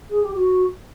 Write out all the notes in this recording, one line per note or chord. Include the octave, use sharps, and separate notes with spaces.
G#4
G4
F#4